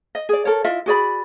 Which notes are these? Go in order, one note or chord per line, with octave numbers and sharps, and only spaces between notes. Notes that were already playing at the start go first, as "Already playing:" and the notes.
D#5
G#4 D5
A4 A#4 C#5
E4 F4 D#5 E5
F#4 G#4 D5 B5